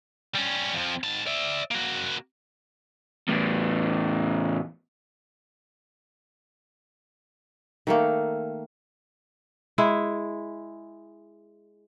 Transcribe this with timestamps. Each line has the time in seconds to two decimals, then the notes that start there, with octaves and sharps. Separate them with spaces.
0.35 G3 C#4
0.73 F2 F3
1.04 G#2 A5
1.27 D5 E5
1.71 A#3 F#4
3.28 E2 A2
7.87 D#3 A3 A#3
9.78 G#3 E4